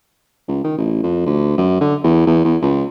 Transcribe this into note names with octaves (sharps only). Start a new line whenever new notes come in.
C#2
D#3
A1
F2
D2
F#2
D3
E2
E2
E2
C#2